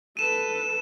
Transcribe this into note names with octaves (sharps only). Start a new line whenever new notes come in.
A4 B4 D#7 E7